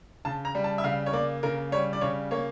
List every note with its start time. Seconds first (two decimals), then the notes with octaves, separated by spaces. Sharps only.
0.25 C#3 A5
0.45 A#5
0.55 G3
0.64 A5
0.78 E5
0.84 C#3 F5
1.06 C#5
1.13 A#3 D5
1.43 C#3 A#4
1.72 G3 C#5
1.93 D5
2.01 C#3 C#5
2.31 A#3 C#5